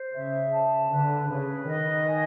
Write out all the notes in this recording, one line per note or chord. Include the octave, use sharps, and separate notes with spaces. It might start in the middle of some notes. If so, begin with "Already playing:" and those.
Already playing: C5
C#3 E5
A5
D3 B4
C#3 B4
D#3 D#5
G#5